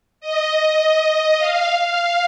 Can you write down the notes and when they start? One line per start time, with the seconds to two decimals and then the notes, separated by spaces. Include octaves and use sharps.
0.21 D#5
1.38 F5
1.78 F5